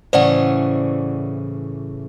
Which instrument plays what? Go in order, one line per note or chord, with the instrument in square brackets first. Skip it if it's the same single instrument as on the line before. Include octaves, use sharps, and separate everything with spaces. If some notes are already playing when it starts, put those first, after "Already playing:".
[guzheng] A2 C#3 E3 [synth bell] C5 D5 F#5